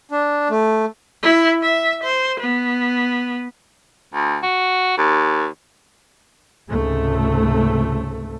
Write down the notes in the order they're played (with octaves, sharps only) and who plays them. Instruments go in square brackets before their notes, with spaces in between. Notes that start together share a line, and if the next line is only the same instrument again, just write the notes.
[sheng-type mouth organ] D4
A3
[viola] E4
E5
C5
B3
[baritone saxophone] D2
F#4
D#2
[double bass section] C#2 G#2 C3 A3